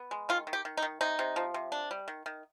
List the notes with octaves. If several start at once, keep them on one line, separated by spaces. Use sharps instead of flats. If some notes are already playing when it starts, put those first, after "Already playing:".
Already playing: B3
G#3
D#3 F4
D#3
G4
D#3
D#4
D#3
C3 D#4
C3
F3
C3
D4
G3
D#3
D#3